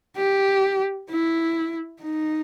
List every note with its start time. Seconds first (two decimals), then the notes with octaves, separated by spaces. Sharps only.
0.17 G4
1.10 E4
2.02 D#4